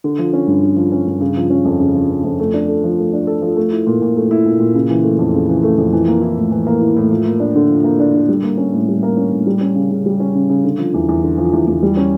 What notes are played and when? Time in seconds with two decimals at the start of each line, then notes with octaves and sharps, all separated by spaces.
0.04 D3
0.19 F3
0.33 C#4
0.47 G2
0.63 D3
0.77 F3
0.92 C#4
1.07 G2
1.21 C#3
1.37 F3
1.50 C#4
1.65 F2
1.80 C#3
1.95 F3
2.10 C#4
2.24 F2
2.40 A3
2.54 D4
2.69 A4
2.84 F3
2.99 A3
3.13 D4
3.27 A4
3.42 F3
3.56 A3
3.72 E4
3.87 A#2
4.02 A#2
4.17 A3
4.31 E4
4.46 A#2
4.60 A#2
4.74 C#3
4.90 E3
5.04 A3
5.19 F2
5.34 C#3
5.49 E3
5.63 A3
5.78 F2
5.93 E3
6.08 A#3
6.22 E4
6.37 A2
6.51 E3
6.67 A#3
6.81 E4
6.96 A2
7.11 F3
7.26 A#3
7.40 D4
7.55 D3
7.69 F3
7.84 A#3
8.00 D4
8.14 D3
8.29 G3
8.43 A#3
8.57 C#4
8.73 A2
8.88 G3
9.03 A#3
9.17 C#4
9.32 A2
9.47 G3
9.61 C#4
9.75 C#3
9.91 C#3
10.06 G3
10.20 C#4
10.35 C#3
10.50 C#3
10.64 D3
10.78 F3
10.94 E2
11.09 E2
11.23 D3
11.38 F3
11.53 E2
11.68 E2
11.83 G3
11.97 C#4